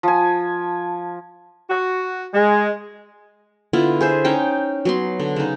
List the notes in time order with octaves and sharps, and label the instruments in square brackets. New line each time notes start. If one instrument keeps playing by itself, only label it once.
[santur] F3 G#5
[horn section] F#4
G#3
[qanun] D3 B3 E4 F4
G#4 C5 E5
C#4 D#4 G5
F#3 B3 C6
D3
C#3 D#4